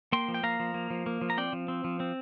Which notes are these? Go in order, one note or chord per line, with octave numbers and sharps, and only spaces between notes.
A#3 G5 C6
F3
G5
A#3 F5 A#5
F3
A#3
F3
A#3
F3
A#5
C4 D5 G5
F3
C4
F3
C4